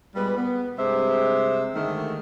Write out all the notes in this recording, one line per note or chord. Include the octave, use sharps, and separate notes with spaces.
A#2 G3 G#3 B3 B4
B3
G2 C3 G#3 G4 C5 E5
D3 D#3 G#3 A3